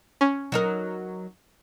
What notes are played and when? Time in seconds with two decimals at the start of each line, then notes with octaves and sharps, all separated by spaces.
0.21 C#4
0.52 F#3 D#4 A#4